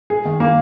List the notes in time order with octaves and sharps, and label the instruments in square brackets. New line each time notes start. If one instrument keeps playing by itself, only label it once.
[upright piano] G#4
D#3
A#3